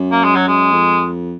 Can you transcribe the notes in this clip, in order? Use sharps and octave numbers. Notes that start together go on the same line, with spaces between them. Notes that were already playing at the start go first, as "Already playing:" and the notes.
Already playing: F#2
A#3
G#3
F#3
G#3
F2